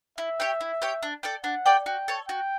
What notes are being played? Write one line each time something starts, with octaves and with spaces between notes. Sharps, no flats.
E4 E5
G4 C#5 G5
E4
G4 C#5 G5
D4
A4 D5 G5
D4 F#5
A4 D5 G5
F#4 G5
A4 C#5
F#4 G5